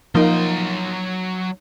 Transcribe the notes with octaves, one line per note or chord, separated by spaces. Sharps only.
F3 F#3 A#3 D#4 C6